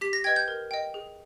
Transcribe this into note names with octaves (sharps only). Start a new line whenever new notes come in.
G4 B6
A#6
B4 D#5 G5 G#6
G6
A#4
D#5 G5
G#4